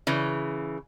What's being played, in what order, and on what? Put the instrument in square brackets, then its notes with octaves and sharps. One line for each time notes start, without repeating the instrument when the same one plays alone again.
[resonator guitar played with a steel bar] C#3 E3